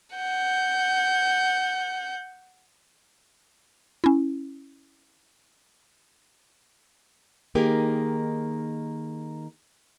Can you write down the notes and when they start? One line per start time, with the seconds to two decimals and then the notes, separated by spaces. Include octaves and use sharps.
0.16 F#5 G6
4.04 C#4 E4
7.55 D#3 A#3 D#4 G4 G#4 A#4